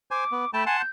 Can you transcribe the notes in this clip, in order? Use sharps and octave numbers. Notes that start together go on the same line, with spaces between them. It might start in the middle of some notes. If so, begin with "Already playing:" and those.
C5 G#5 D6
B3
A3 G5 A5 B5
F#5 G#5 A5 C6
G6